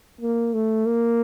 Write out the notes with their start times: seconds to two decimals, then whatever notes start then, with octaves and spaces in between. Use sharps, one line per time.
0.21 A#3
0.54 A3
0.87 A#3